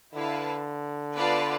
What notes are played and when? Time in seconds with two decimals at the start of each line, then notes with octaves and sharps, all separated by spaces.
0.15 D3 E4 B4 F5 A5
1.16 B3 F4 B4 D5 A5